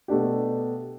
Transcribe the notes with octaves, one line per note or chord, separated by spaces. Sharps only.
B2 A3 D4 G4